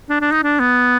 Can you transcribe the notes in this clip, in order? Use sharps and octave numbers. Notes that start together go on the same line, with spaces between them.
D4
D4
D#4
D4
B3